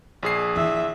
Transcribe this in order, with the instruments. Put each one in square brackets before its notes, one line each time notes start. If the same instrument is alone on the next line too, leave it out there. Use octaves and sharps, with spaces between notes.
[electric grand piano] A#1 G#4 C7
[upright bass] E3 [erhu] E5